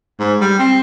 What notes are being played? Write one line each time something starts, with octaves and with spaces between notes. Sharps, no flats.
G#2
G3
C4